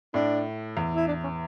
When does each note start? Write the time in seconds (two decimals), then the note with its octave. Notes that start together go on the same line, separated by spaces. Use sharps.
0.14 A2 D4
0.77 E2
0.96 E4
1.08 D4
1.24 C#4